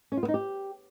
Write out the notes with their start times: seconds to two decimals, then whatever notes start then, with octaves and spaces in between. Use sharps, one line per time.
0.12 C#4
0.17 F4
0.23 B3
0.28 D#4
0.34 G4